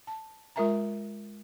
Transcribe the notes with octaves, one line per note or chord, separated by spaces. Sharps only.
A5
G#3 F4 A#4 E5 G#5 A#5